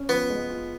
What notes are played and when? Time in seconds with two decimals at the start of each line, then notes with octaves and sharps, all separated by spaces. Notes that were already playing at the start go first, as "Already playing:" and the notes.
Already playing: C#4
0.09 F3 B3
0.30 G#3
0.50 F4